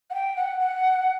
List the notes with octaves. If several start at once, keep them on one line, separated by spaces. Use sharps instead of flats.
F#5
G5
F#5
F#5